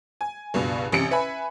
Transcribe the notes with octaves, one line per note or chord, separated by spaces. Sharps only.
G#5
C#2 G2 B2
A1 C3 C#7
B4 E5 G#5 B5